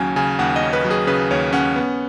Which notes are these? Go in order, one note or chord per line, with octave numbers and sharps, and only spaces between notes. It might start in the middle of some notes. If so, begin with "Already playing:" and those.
Already playing: D#2 C#3 F#3 C#4 G#5
C#3 G#5
D#2 F#5
D#5
C#4
B4
F#3
G#4
C#3 B4
D#2 C#5
C#4 F#5
B3